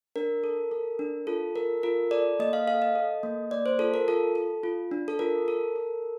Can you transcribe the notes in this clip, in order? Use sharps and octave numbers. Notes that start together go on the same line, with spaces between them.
D4 A#4
A4
A4
D4
F4 A4
A4 A#4
F4 A#4
A4 D5
A#3 D#5
F5
A4 F5
D#5
A4
A#3
A#3 D5
C5
F4 A4
A#4
F4 A4
A4
F4
D4
A4
F4 A#4
A4
A4